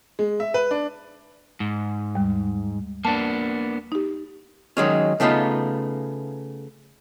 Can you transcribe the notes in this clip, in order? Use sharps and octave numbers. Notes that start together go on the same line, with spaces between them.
G#3
E5
B4
D4
G#2
D#2 G3
A#3 B3 D4 A5
D#4 G4
D#3 F#3 G#3 C#4
C#3 A3 B3 D#4 F4